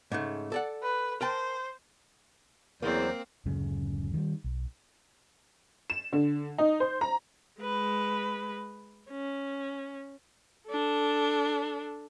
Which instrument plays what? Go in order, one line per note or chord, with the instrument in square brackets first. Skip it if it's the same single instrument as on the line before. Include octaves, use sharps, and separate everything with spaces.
[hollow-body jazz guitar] G#2 C#3 A3
A4 D5 F#5
[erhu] B4
[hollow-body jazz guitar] A#4 G5 A5 [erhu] C5
[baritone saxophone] E2 [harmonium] F#3 C5 D5 [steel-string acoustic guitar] A#3 [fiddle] C4
[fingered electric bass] D1 F#2 C#3 G#3
D#3 G3
B1
[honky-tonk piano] E7
D3
D#4
C5
A#5
[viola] G#3 B4
C#4
D4 A4